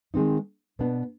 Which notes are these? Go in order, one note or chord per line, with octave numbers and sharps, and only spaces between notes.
D#3 G#3 C4 D#4
B2 B3 D4